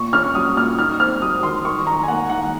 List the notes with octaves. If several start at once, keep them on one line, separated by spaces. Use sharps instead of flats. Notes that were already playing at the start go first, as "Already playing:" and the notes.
Already playing: A#2 C#6
C#4 F6
F#3 D#6
A#2 F6
D#4 F6
C4 F6
F#3 D#6
D#3 C6
D#3 C#6
D#4 A#5
G#5
A#3 F#5
D#3 F#5